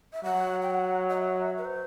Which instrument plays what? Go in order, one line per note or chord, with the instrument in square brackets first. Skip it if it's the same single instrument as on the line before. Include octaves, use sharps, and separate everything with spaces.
[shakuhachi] E5
[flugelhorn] F#3 [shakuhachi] F#5
[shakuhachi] G5
F#5
D#5
E5
B4
C5